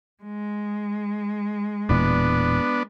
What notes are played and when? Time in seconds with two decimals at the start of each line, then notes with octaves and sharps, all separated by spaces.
0.24 G#3
1.89 E1 A#2 E3 B3 D4